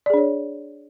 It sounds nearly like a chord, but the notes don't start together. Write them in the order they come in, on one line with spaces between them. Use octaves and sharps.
D5 G#4 D4 C#5